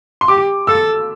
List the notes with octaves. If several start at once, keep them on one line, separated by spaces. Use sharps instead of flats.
C6
G4 D6
A4 E6